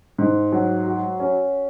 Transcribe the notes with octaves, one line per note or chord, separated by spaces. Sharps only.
G#2
F#3
F#4
C#4